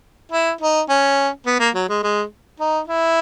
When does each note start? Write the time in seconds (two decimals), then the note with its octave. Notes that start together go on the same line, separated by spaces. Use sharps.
0.32 E4
0.61 D#4
0.89 C#4
1.46 B3
1.59 A#3
1.75 F#3
1.89 G#3
2.03 G#3
2.60 D#4
2.87 E4